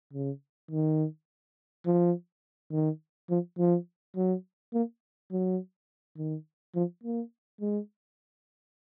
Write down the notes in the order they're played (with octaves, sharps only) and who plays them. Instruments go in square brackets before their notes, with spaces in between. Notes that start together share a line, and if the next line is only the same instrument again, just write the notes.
[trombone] C#3
D#3
F3
D#3
F3
F3
F#3
A#3
F#3
D#3
F3
A#3
G#3